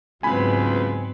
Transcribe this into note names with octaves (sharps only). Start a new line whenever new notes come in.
C#2 G#2 F#3 B3 C4 B4 G#5 B5